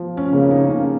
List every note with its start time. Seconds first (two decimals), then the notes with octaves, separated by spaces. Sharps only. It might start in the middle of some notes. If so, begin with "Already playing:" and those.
Already playing: F3
0.17 C#4
0.33 C#3 A#3
0.51 D#4
0.63 A#3
0.70 C#4